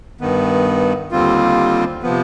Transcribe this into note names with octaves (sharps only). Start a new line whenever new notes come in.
G2 D#3 B3
D#2 D3 G3 C4 F4
C3 F3 B3